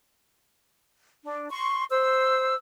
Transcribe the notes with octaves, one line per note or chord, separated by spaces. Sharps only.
D4
C6 C#6
C5 E6